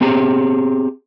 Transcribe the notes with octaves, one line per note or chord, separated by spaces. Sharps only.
B3 C4 G4 G#4 A#5